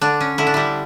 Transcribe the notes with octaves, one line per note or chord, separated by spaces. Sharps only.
D3 D4
C#4
D3 E4
D4
G3 E4